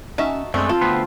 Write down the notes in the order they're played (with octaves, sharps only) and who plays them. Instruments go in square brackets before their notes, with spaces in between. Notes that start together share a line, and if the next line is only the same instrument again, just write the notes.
[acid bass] C#4 [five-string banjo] D#4 F#4 E5 [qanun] A5
[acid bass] F#2 [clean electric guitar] G#3 A3 [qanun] C4 G5 [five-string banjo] D4
[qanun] F4 [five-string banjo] A4
[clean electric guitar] D2 C4 B4 [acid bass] B3